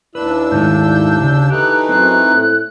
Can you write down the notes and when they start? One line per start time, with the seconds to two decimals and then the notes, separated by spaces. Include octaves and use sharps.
0.15 D#2 D4 E4 B4 E6
0.51 G#2 D#3 A3 G6
1.21 C#3
1.50 E3 A3 D#4 G4 F#6
1.89 F#2 C4 C5 F#6
2.31 A2